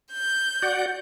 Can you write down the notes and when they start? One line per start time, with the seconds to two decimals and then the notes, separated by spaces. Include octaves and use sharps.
0.12 G6
0.62 F#4 D5 F#5